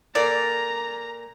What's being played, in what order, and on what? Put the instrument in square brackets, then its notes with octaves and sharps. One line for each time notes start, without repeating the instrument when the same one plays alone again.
[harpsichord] A#2 A#3 A4 [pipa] D5 [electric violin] A#5